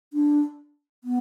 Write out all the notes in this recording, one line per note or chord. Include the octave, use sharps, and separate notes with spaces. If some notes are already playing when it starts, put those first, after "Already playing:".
D4
B3